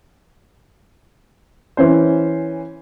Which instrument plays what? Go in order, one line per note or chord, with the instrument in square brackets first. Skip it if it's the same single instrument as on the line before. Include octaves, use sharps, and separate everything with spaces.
[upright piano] E3 C#4 C5